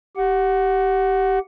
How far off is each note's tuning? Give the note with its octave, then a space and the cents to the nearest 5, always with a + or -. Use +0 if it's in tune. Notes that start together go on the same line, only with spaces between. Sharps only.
G4 -15 F#5 +0